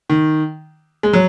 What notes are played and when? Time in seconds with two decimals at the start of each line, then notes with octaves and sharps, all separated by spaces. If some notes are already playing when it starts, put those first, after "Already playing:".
0.10 D#3
1.03 G#3
1.13 F#3